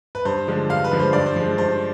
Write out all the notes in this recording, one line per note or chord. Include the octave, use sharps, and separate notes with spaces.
B4
G2 C5
D3 F3 G#3
G2 F5
B4
D3 F3 G#3
C5
G2 D5
C5
F3 G#3
G2 C5